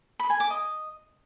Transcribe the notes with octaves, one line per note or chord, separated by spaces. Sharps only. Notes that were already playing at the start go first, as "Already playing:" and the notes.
B5
G#5
D6
D#5